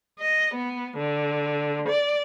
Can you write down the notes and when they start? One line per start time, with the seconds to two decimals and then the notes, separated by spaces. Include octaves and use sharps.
0.19 D#5
0.54 B3
0.97 D3
1.88 D5